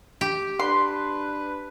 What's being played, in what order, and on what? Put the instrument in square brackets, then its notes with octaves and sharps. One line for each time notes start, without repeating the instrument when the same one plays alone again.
[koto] G4
[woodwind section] D4 B4 [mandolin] C6